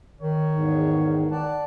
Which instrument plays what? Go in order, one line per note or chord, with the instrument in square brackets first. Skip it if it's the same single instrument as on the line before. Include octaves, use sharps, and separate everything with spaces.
[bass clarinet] D#3 [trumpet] C#5
[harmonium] E2 G#2
[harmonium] D5 A5 [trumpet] F#5